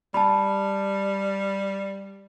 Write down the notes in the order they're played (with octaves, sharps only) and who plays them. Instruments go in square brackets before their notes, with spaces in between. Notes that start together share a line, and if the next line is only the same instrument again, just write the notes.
[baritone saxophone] G3 [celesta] A5 B5